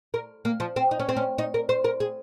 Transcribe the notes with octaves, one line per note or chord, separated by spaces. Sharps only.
A#4
A#3
F3
C4
D#4
C#4
C4
C#4
D#4
A#4
C5
A#4
G#4